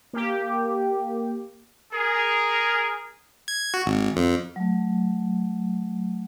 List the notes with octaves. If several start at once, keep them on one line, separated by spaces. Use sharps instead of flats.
A#3 G4
G#4 A#4
G#6
F#4
G#1
F2
F#3 A3